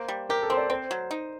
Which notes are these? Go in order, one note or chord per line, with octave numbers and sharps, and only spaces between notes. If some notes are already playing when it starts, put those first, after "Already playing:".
Already playing: A#3 C5
G3
G4 A#4
A4
C4 C5
D5
C4 C5
F#3
D#4